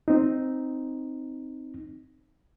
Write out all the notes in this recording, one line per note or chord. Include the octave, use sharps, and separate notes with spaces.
C4 D#4